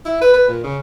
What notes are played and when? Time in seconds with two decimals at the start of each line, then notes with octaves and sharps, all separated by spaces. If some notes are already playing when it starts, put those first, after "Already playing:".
0.05 E4
0.21 B4
0.34 B4
0.48 A#2
0.64 C#3